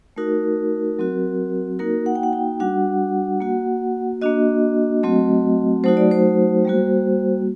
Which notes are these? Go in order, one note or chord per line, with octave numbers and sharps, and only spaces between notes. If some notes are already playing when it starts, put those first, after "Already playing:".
A3 D#4 F#4 A#4
F#3 C4 F#4
A#3 D#4 F#4 A#4
F#5
G5
F#5
G5
G3 D4 F#4 F#5
A#3 F#4
A#3 D4 F#4 D#5
F#3 A3 C4 F#4
F#3 A3 D#4 F#4 C5
D5
C5
G3 A#3 F#4